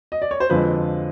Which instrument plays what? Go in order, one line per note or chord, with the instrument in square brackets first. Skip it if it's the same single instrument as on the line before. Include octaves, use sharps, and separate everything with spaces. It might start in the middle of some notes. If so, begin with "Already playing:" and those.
[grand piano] D#5
D5
C#5
C5
F2 D3 F3 G#3 B4